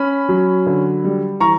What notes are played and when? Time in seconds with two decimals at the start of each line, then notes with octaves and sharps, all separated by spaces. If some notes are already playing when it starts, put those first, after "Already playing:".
Already playing: C#4 B5
0.29 F#3
0.66 D3
1.04 G3
1.40 E3 A#5 C#6